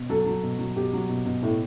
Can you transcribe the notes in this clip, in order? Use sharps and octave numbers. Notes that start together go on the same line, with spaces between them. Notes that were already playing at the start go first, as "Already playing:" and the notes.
Already playing: B2
F#3 A4
F#3
B2
F#3
B2 G4
F#3
B2
B2
A2